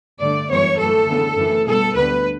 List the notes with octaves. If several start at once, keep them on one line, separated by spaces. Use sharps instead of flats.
G2 D3 A3 D5
F#2 E3 G3 B3 C#5
F#2 E3 A3 A4
D2 C#3 E3 B3
F#2 E3 A3
B2 G3 B3 A4
D2 D3 G3 B3 B4